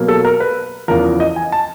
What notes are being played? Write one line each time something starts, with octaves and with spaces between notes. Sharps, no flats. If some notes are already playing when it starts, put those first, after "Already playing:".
Already playing: B2 F#3 A#3
A4
A#4
B4
E2 C#3 F3 A#4
D#5
G#5
A5